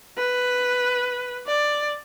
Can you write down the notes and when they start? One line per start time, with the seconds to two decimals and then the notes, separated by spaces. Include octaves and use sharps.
0.18 B4
1.47 D5